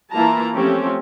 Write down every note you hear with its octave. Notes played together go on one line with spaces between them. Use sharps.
E3 A#3 E4 F4 A5 A#5
F3 A3 C4 C#4 G4